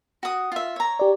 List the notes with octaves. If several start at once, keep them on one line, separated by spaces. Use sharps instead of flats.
F#4 D#6
F4 E5
C#5 A#5
G4 D5